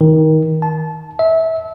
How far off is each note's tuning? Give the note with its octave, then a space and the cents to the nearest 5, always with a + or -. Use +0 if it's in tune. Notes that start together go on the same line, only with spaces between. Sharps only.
D#3 +20
A5 -25
E5 -25